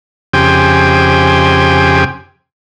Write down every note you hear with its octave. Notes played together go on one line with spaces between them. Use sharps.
F2 C#3 G4 C5 G5 G#5